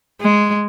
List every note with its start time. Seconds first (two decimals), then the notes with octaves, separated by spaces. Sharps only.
0.21 G#3